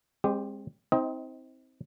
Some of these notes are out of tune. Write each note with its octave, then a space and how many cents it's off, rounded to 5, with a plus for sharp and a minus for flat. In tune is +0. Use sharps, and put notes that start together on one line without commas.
G#3 -30 C4 +25 G4 +0
C4 +0 D#4 +45 D#5 +25